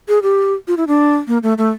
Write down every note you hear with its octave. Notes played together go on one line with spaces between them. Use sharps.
G#4
G4
F4
E4
D4
A#3
A3
A3